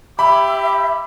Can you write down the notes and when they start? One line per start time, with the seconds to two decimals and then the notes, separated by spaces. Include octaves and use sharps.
0.19 G4 E5 B5